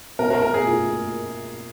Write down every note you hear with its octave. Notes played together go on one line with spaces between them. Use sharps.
B2 A#4
A#4
B2 A#4
G#4
F4
A#3